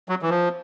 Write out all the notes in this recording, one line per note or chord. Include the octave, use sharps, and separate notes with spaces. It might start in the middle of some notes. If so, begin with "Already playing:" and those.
F#3
E3
F3